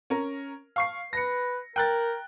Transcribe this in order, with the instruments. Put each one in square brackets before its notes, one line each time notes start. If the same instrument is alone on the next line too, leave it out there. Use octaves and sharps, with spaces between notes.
[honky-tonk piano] C#4 A#4
F5 C#6 C7
[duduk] B4 [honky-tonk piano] A#6 C#7
[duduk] A#4 [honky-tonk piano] G5 F#6 A6